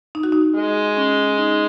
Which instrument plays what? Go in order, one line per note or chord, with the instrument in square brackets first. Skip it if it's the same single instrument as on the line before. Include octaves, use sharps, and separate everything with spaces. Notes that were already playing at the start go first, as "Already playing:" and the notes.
[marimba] D#4
F#4
D#4
[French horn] G#3
[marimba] C#4
D#4